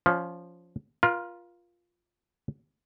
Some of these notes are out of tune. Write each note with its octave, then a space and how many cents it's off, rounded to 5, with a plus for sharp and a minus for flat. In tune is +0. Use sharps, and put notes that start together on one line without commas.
F3 +0 C#4 +20
F4 +0 A#4 +40